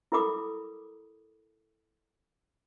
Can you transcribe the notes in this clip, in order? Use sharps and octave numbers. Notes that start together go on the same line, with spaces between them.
E4 A4 A#4 B5 D6 D#6